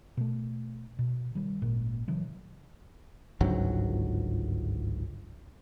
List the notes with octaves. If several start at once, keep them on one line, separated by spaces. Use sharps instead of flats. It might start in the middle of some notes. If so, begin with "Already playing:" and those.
B2 A3
B2
D#3 G3
G#1 A#2 G#3 A#3
C#3 E3 F#3
G1 C#2 G#2 F#3